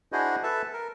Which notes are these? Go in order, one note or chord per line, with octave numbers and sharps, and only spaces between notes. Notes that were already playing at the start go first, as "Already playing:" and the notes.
D4 E4 F#4 G#4 C5 D#5
A4 B4 E5 A5
A#4